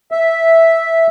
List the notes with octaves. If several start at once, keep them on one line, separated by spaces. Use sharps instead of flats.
E5